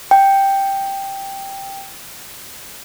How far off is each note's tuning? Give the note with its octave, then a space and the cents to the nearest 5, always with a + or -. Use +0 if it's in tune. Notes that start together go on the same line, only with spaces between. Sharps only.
G5 +0